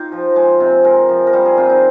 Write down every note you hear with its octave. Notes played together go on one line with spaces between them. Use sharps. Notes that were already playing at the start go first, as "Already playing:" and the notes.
Already playing: D#4 F4 G4
F3
G#3
C3
G#3 A#4
F3
A#4
G3 C5
G#4
C3 F4
D#4